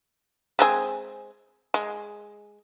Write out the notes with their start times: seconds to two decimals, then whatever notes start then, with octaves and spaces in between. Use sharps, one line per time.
0.59 G#3 C4 G#4
1.74 G#3